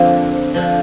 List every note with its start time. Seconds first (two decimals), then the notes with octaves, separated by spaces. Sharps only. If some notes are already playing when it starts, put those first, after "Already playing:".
Already playing: F2 D3 F3 A#3 C4
0.54 D3 F3